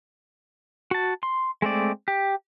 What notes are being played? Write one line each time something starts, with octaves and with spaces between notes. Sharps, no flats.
F#4 A5
C6
G#3 A3 C4 D5
G4